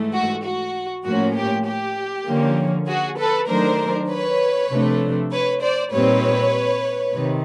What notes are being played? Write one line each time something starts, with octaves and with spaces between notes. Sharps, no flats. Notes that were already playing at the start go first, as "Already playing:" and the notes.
Already playing: G#2 E3 A3
F#4
F#4
A2 F3 A#3 C#4 F#4
G4
G4
D3 F3 A#3 C#4
F#4 G#4
A4 B4
D#3 F#3 A3 D4 A#4 C5
B4 C#5
C3 F3 A3 D4
B4 C#5
C5 D5
A#2 G3 C4 D#4 B4 C#5
C3 D#3